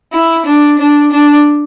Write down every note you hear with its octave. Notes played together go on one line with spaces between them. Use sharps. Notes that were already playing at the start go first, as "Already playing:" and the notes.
E4
D4
D4
D4